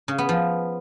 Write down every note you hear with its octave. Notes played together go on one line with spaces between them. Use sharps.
C#3
B3
F3